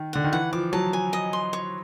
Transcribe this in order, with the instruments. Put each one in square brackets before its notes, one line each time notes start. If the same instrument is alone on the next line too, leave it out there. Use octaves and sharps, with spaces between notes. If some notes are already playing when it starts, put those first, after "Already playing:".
Already playing: [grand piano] D#3
[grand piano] D3 [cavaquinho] F#5
[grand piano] D#3
[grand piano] E3 [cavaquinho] F#5
[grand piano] F3 [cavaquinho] D6
[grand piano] F#3 [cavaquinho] A5
[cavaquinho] G#5
D#5
C6
C#5